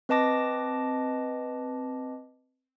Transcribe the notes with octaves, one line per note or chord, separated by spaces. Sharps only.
C4 B4 D#5 A5 D6 A#6